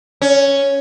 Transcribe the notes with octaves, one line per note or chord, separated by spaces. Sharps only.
C#4